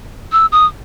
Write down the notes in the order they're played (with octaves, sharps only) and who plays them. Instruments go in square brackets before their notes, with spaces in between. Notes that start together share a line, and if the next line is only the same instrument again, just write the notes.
[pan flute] E6
D#6